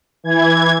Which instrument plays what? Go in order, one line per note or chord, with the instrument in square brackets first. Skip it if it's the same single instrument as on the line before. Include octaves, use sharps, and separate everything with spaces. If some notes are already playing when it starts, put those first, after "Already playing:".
[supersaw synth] E3 G#6